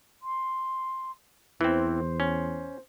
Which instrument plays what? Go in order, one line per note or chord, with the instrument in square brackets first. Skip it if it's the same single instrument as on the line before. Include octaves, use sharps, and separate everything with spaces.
[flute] C6
[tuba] E2 [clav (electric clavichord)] E3 C4 [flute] C5
[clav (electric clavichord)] C#4